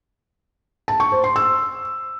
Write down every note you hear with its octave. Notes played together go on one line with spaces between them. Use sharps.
A5
C#6
C5
C6
E6